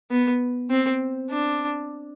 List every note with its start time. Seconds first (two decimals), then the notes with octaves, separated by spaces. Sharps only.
0.11 B3
0.70 C4
1.30 D4